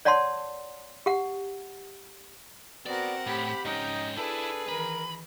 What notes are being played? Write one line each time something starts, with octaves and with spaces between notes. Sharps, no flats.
C#5 D5 F#5 A5 C6
G4 F#5
B3 C4 F#4 A#4 D5 F#5
A2 G4 B5
G#2 C#4 D#4 D#5 G5
D4 E4 G#4 A4 B4
D#3 E3 A#4 B5